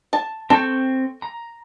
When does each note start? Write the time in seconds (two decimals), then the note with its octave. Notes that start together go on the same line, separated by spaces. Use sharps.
0.13 A5
0.50 C4 A4 C#6 G6
1.22 A#5